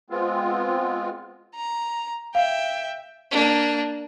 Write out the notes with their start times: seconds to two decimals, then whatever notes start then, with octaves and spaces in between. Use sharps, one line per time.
0.10 G#3 B3 C4 F4
1.56 A#5
2.35 E5 F5 G5
3.31 A#3 D4